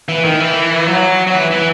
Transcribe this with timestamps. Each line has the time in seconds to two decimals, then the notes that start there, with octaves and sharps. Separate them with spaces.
0.09 E3
0.24 D#3
0.40 E3
0.87 F#3
1.27 F#3
1.34 E3
1.51 E3